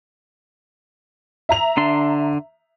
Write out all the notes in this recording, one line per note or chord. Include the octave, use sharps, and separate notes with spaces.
E5 A#5 F7
D3 D4 C6